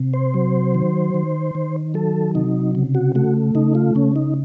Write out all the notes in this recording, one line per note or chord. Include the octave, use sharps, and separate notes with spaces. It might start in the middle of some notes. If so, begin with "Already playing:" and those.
Already playing: C3
C5
F#3
D#3
D#3
D#3
F#3 A4
C3 D#4
C#3
F#4
A3 F#4
C#3 D#4
F4
C#3 C#4
D#4